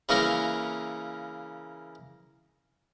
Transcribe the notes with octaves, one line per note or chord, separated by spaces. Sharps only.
C#3 E3 A#3 C#4 A#4